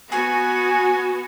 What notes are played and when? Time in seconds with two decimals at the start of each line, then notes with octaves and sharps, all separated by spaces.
0.12 B3 F#4 G#5